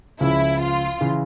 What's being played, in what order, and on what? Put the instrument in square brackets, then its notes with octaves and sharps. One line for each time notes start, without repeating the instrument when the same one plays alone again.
[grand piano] C#2 C#3 F3 [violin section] E4
[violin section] F4
[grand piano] C#3 E3